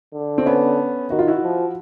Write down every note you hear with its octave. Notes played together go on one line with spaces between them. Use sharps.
D3
C4
B3 C#4
D#3 F#4
F4
E4 F#4
F3